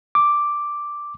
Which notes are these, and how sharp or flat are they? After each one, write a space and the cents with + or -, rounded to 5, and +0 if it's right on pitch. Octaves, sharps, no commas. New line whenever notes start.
D6 +0